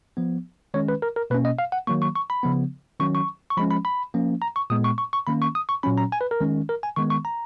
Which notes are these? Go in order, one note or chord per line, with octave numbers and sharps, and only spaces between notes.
F3 B3
D#3 G#3 C#4 C#5
B4
A#4
A#4
B2 A#3 C#4 B4
D#5
F5
F#5
D#3 F#3 A#3 C#6
C#6
C#6
B5
C#3 F3 B3
D#3 F#3 C#4 C#6
C#6
C#6
F3 G#3 C#4 B5
B5
B5
F3 A#3 C#4
A#5
C#6
A#2 G#3 B3 D#6
C#6
C#6
C#6
D#3 A#3 C#4 B5
C#6
D#6
C#6
A#2 F#3 C#4 B5
A#5
G#5
B4
A#4
D#3 G#3 C#4
A#4
G#5
D#3 G#3 B3 C#6
C#6
A#5